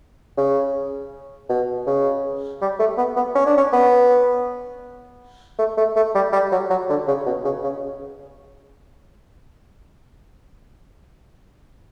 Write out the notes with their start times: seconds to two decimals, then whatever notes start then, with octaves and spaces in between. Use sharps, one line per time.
0.37 C#3
1.49 B2
1.87 C#3
2.61 G3
2.79 A3
2.98 B3
3.16 B3
3.35 C#4
3.46 D4
3.57 C#4
3.73 B3
5.59 A3
5.77 A3
5.96 A3
6.15 G3
6.32 G3
6.52 F#3
6.70 F#3
6.89 D3
7.07 C#3
7.26 B2
7.45 C#3
7.63 C#3